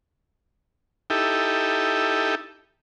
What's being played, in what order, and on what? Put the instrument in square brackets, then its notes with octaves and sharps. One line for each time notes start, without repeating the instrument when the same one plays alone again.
[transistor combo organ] D#4 E4 G4 A4